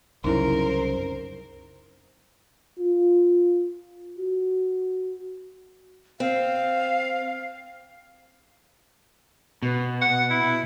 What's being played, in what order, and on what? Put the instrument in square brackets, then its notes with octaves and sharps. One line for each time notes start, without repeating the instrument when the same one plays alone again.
[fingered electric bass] C2 F#2 C#3 [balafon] D#4 E4 [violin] A#4 C5
[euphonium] F4
F#4
[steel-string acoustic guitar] C4 [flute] F5
[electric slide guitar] B2
[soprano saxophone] F#5
E4